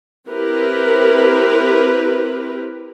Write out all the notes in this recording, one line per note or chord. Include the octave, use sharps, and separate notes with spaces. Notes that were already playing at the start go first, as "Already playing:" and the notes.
C4 E4 G4 A#4 B4